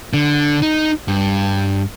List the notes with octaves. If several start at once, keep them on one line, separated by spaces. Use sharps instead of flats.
D3
D#4
G2